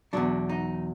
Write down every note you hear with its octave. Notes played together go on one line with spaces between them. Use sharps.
E2 B2 F#3 D4
D#4